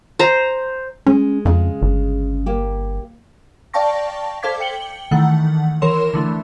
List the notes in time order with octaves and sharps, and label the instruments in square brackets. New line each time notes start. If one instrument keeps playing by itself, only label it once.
[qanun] C5 A#5
[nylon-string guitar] G#3 [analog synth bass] C#4
[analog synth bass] F2 [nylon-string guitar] C#3 G#3
[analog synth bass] G1
[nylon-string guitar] A#3 G4
[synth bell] D5 F5 G5 A5 C#6 A#6
A4 C5 F5 D6 G#6 B6
G5 C#7 F#7 G7
D#3 E3 A3 F#5
E3 A#4 C#5 C6 E7
D3 E3 A3